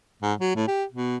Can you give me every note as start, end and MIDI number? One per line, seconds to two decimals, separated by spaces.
0.23 0.34 44
0.41 0.52 54
0.56 0.66 45
0.68 0.84 67
0.92 1.17 47